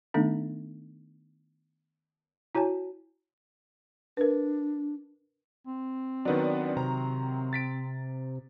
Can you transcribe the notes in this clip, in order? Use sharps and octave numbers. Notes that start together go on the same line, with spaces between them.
D#3 A3 B3 D4 D#4
E4 F#4 C#5 G#5 A5
D4 A#4 B4
C4
D#3 F#3 B3 D4
C3 A#5
A6 B6 D7